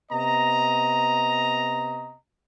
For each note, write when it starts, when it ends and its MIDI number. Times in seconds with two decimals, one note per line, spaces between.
0.11 2.15 48
0.11 2.15 59
0.11 2.15 75
0.11 2.15 82